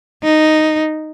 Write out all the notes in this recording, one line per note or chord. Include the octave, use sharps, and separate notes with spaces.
D#4